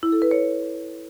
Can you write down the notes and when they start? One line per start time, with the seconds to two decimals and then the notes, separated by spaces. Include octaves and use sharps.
0.03 E4
0.12 A4
0.22 B4
0.31 C#5